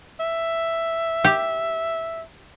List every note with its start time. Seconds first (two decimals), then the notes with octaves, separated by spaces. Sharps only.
0.20 E5
1.24 G4